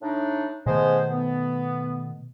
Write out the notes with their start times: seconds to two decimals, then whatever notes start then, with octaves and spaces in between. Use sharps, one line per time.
0.02 A2 D4 D#4
0.66 B2 D#3 G#3 A3 B3 C5
1.11 B3